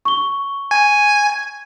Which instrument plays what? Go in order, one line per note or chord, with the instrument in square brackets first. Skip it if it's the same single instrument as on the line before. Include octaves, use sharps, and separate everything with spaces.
[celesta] C#6 G7
[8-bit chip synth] G#5